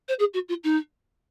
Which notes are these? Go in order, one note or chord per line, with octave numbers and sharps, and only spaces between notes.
C5
G#4
F#4
F4
D#4